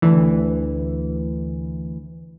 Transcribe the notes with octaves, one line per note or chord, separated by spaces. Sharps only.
D2 E3